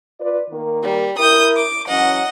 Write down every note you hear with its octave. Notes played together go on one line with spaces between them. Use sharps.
F4 B4 D5
D#3 A#3 A#4
G3
E4 A#4 D#6 G6
D6
E3 F#3 C#4 D#5 F#5